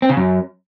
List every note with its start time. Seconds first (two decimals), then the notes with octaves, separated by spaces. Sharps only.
0.02 C4
0.09 C#3
0.17 F#2